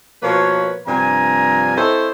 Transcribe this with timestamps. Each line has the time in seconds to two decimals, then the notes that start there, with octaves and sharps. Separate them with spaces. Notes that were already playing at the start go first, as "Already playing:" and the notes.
0.23 B2 F3 A#3 B4 C#5
0.87 G2 C3 F3 D4 G#5 A#5
1.77 C4 E4 A4 C5 C#5 D#5